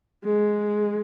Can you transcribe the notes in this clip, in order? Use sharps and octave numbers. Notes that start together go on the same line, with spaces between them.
G#3